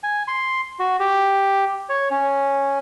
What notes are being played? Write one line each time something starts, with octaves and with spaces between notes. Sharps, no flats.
G#5
C6
F#4
G4
C#5
C#4